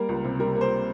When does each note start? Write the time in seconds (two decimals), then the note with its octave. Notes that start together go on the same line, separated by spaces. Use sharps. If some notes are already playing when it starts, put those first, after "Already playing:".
Already playing: G3 A#3 A#4
0.09 C#2
0.24 C3
0.40 G3 A#4
0.55 A#3
0.61 C5